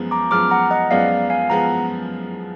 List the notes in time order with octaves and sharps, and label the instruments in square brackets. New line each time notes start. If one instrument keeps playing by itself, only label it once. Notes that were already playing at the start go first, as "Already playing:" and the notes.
Already playing: [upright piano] F#2 F3 G#3 B3
[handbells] A#5 D6
[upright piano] F#2 F3 G#3 B3 [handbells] D6 F6
[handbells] F#5 A#5
D#5 F#5
[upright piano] F#2 F3 G#3 B3 [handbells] D5 F5
[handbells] F5 G#5
[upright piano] F3 G#3 B3 [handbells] F#5 A#5